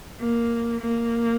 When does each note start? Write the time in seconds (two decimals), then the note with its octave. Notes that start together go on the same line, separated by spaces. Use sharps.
0.20 A#3
0.80 A#3